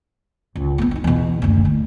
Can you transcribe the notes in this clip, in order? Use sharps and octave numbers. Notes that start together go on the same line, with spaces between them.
C#2
A3 B3
C4 D#4
E2 B2
F#1 D2
A3